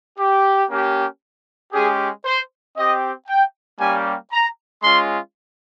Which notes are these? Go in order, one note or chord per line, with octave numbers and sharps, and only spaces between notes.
G4
A#3 C#4 G4
G#3 C#4 G4 G#4
C5
C4 G4 D#5
G5
G3 A#3 C#4 G4 G#5
A#5
G#3 C#4 F4 C6